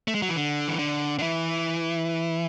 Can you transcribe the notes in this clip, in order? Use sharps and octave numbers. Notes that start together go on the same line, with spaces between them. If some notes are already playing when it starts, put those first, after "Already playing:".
A3
G#3
F#3
E3
D3
E3
D3
D3
E3